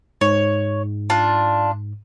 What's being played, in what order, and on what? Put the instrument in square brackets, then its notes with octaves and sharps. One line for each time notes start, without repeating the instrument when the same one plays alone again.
[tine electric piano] G#2 [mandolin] C#5
[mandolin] D4 F4